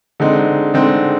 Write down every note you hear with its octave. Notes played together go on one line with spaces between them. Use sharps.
D3 G#3 C4 D#4
D3 G#3 C4 D#4